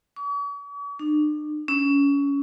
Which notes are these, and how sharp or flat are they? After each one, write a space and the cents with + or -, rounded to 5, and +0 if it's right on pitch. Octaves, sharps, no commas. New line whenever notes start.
C#6 +45
D4 +45
C#4 +25